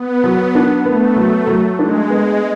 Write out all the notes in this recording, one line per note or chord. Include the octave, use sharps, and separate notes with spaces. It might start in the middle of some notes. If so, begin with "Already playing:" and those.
Already playing: B3
F#3
D4
A3 B3
F#3
F#3
G#3 D4
B3